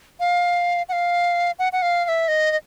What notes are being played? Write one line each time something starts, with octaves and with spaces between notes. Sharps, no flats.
F5
F#5
F5
F#5
F#5
F5
F5
E5
D#5
D#5